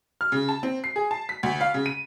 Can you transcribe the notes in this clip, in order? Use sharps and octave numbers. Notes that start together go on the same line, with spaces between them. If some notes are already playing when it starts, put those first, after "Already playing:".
F6
C#3
A5
C4
C7
G#4
A5
B6
D2
F5
C#3
D#7